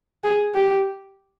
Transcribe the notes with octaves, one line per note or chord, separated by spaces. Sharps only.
G#4
G4